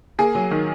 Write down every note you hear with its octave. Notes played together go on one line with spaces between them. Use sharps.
A#3 G#4
F#3
D#3